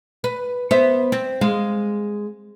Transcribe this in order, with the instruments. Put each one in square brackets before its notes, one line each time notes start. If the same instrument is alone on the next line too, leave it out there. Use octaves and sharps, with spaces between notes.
[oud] B4
[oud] B3 E5 [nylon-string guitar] C5
[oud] C4
[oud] G#3 [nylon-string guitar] F5